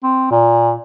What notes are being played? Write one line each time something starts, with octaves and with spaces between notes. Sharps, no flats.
C4
A#2